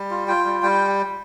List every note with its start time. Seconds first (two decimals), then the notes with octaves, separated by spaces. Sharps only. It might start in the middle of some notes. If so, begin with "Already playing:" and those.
Already playing: G3
0.11 F4
0.28 F4 G5
0.45 G3
0.63 G3 G5